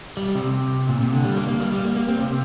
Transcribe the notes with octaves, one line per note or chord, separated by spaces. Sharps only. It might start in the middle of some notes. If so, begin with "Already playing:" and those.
G3
C3
A#2
C3
D3
G3
A#3
A#3
G3
G3
A#3
A#3
C4
C3